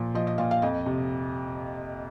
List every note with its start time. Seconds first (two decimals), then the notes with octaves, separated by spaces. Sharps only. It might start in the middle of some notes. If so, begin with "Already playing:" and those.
Already playing: A#2 F3
0.14 F3 D#5
0.27 D#5
0.38 A#2 F5
0.51 F5
0.62 F2 D#5
0.86 C3